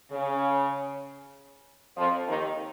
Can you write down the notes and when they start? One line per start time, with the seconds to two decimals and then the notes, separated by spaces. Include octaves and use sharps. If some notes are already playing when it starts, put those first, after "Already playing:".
0.11 C#3
1.97 F2 F3
2.28 D#2 D#3